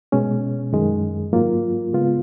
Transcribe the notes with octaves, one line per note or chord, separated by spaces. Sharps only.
B2 G#3 C#4
F#2 D#3 G#3
G#2 F#3 A#3 F4
C#3 G#3 B3 F4